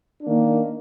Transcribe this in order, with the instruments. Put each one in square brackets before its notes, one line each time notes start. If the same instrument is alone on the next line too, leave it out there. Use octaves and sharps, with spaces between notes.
[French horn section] D#3 A#3 D4